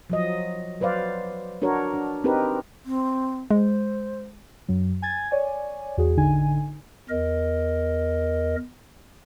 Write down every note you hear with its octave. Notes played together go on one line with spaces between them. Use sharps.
F3 F#3 D#5
F#3 B4 C5 D5 F5
D4 F#4 A#4 C#5
D4
C4 D#4 G4 A#4 B4
C4
G#3 C5
F#2 F#3
G#5 G#6 A6
C#5 D5 G#5
E2 F#4 G#4
A1 D3 D#4 G#5
E2 A#4 D#5